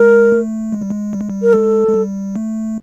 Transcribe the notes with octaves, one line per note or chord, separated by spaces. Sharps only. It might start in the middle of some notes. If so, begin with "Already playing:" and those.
Already playing: G#3 A#4
A3
G#3
G3
G#3
G3
G#3
G3
A#4
G#3 A4
G#3
G3
A3